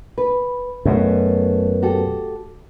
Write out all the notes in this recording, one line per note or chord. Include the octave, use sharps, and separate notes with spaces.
B4
F#2 B2 A3
F#4 G4 A4